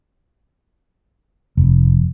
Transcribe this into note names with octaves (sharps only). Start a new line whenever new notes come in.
F1